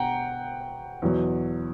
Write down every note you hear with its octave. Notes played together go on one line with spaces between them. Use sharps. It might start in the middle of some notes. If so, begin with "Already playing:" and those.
Already playing: B2 F#5 G5 A#5
E2 B2 F#3